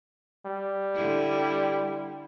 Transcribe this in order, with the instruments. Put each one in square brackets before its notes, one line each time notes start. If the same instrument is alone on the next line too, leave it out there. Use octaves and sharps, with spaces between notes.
[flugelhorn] G3
[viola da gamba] D3 E4